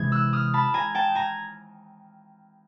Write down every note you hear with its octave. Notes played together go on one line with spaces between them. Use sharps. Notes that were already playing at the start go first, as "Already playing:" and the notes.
Already playing: C3 E3 G#3 G#6
E6 F#6
D#6 F6
A5 B5
G#5 A#5
G5 A5
G#5 A#5